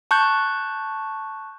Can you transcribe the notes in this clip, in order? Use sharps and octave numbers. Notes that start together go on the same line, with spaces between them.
A5 C#6 F#6 G6